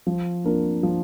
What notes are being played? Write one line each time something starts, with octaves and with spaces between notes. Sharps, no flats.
F3
A#3 D4 F4 A#4
F3